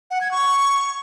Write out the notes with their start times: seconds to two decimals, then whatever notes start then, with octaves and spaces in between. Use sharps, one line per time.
0.11 F#5
0.21 G#6
0.31 C#6